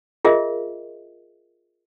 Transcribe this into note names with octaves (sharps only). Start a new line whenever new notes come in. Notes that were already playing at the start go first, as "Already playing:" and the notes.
F4 G#4 A#4 D#5 E5